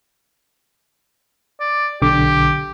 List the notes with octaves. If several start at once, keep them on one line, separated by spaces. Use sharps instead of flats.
D5
B1 D3 G4 D6